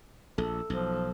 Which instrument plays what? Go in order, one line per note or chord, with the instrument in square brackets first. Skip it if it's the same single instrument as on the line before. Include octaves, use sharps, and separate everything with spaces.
[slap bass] A#1 [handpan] A4
[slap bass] B1 [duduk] F3